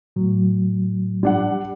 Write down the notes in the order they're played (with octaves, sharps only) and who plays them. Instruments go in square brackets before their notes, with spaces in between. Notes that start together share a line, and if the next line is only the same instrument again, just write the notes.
[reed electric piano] A2 F#3
[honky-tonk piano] G3 D4 F#5